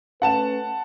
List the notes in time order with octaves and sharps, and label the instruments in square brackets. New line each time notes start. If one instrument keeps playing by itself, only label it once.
[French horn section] A3 C#4 B4 [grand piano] F#5 A5 E7